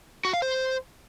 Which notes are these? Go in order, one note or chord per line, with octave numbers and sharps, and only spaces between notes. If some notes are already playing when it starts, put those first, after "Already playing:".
F#4
F5
C5